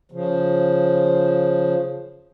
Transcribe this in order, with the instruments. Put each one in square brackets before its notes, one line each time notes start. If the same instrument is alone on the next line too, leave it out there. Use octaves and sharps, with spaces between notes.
[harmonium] C#3 F3